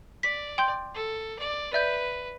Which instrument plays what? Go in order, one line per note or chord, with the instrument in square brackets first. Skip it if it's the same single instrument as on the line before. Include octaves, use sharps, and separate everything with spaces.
[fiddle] D5 [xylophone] B6
[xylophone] G5 C6 G6
[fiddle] A4
D5
[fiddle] B4 [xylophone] D5 E5 G6